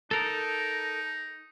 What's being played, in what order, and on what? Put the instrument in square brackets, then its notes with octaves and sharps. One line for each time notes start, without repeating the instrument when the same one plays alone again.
[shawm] D#4 [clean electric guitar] A4 A#4